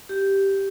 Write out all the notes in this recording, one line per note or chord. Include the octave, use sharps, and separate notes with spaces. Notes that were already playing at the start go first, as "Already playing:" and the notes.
G4